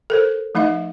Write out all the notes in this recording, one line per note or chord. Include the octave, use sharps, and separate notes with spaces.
A4 A#4 C5
F3 A3 D#4 D#5 E5